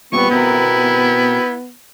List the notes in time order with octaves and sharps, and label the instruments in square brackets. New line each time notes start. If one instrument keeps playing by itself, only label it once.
[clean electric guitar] A#2 G3 C4 [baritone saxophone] B3 [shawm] C#6
[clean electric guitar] B2 C4 A#4 [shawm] E4